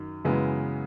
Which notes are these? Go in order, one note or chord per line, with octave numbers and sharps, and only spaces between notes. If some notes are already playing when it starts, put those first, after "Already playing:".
Already playing: F#2 D#3
F#2 C#3 E3 G#3 B3